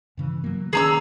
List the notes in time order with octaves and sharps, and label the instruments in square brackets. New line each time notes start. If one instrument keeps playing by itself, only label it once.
[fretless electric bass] G2 C#3 E3
F#3 A#3
[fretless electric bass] D#3 C#4 [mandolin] G#4 A#5 E6